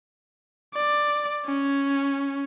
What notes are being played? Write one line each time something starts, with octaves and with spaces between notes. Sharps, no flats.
D5
C#4